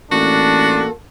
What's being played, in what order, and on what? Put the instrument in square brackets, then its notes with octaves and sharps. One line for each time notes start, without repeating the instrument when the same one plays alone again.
[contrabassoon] A1 [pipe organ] A#3 A4 [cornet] D4 [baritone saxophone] F#4